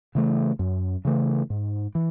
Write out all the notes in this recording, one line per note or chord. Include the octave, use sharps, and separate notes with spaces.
C#3 E3 A3
F#2
C#3 E3 A3
G#2
E3